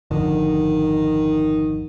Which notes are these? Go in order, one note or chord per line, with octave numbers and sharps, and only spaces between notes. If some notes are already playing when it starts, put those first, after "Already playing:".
G#1 F2 D3 D#3